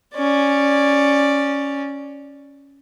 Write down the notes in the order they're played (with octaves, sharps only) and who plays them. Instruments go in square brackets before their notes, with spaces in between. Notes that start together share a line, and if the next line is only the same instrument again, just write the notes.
[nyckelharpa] C#4 D5